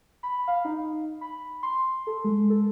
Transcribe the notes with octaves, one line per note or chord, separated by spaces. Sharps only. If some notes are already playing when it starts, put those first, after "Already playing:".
B5
F5
D#4
B5
C6
A4
G#3
A4